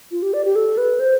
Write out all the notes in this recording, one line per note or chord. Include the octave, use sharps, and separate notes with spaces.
F4
G4
D5
G4
A4
B4
C5